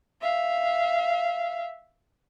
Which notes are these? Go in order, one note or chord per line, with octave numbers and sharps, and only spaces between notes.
E5 F5